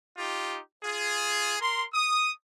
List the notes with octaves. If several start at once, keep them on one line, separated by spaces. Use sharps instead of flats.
D#4 F4 G4
F4 G#4
A#4 C6
D#6